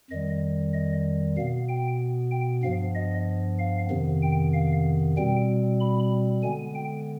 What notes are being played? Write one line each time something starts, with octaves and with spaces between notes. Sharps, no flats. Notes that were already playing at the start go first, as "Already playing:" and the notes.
F2 D#3 G3 D#5
D#5
B2 B3 F5
G5
G5
G2 F3 B3 F5
D#5
F5
F2 C3 D#3 B3
G5
F5
B2 G3 C4 G5
B5
D3 G#3 B3 G#5
G5